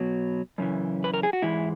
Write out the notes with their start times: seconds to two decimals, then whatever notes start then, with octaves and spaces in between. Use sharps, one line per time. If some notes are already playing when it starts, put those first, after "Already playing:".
Already playing: B2 F#3
0.58 F#2 C#3 E3
1.04 B4
1.14 A#4
1.23 G#4
1.33 F#4
1.42 G#2 E3 G#3 E4